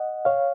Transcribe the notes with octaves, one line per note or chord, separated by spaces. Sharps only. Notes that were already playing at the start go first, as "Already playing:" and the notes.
Already playing: D#5 F#5
C#5 F5